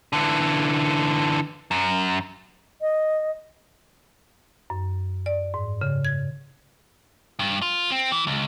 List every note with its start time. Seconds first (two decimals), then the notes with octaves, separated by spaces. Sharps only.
0.13 D3 E3
1.71 F#2
2.81 D#5
4.70 F#2
5.26 D5
5.54 G#2
5.81 C#3
6.05 G#6
7.39 G2
7.62 F4
7.91 C4
8.12 E3
8.27 C#2